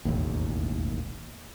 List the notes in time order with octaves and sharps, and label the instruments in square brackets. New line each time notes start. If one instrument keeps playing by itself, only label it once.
[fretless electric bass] E1 A1 D#2